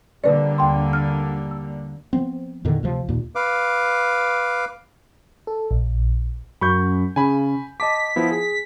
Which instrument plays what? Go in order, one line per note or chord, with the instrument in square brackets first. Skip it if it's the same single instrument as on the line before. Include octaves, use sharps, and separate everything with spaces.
[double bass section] D3 G3 A#3 [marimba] B4 D5
[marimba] D#2 G5 C6
F6
E6
[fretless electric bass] F3 B3 C4
E2 A#2 D3 D#3
D2 C3 F3
D#2 A#2
[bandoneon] B4 F5 D6
[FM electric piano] A4
A#1
[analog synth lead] F#2 [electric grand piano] B5 C#6 G6
[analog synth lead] C#3 [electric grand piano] G#5 B5
[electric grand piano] D#5 A5 D6 [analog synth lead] B6
[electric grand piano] F3 B3 E4
G#4